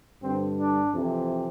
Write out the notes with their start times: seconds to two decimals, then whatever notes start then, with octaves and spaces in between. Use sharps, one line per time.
0.21 G2 D3 C4
0.57 D4
0.93 F2 C3 E3